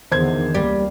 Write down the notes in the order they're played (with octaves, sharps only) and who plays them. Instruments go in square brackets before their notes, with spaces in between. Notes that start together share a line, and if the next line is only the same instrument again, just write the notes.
[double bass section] E2 D3 A#3 [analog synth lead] D#3 [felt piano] C5 G#6
[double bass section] C#2 A#3 [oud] G3